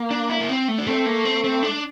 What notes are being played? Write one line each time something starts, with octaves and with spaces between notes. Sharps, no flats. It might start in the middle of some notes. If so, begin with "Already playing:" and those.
Already playing: A#3
D4
E4
A#3
C4
A3
D4
A3 C4
A#3
C4
C4
D4